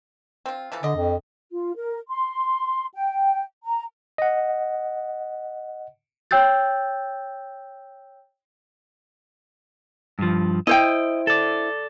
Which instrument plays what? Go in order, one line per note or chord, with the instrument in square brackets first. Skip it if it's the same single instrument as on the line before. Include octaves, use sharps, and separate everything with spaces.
[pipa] C4 F4
E3 F3 A4
[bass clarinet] D3 [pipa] D4 D#5
[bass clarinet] F2
[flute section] F4
A#4
C6
G5
A#5
[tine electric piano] D#5 F#5
[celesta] C#5 G5 E6 G6 A6
[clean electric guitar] G2 F3
[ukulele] E4 C5 G5 [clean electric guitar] D#5
[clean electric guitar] A4 D5